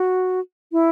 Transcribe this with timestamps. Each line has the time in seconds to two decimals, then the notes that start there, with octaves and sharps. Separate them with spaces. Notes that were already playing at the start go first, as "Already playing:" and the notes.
Already playing: F#4
0.72 E4